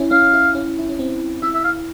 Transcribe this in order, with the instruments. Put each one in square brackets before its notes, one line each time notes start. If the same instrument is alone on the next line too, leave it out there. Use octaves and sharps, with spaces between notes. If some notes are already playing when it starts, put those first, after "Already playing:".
Already playing: [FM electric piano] C#4 E4
[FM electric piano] C#4 [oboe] F5
[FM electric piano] E4
C#4
E4
C#4
C4
[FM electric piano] E4 [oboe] E5
[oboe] E5
F5